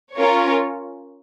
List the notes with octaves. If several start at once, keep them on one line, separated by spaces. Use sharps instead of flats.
C#4 F4 A#4 C#5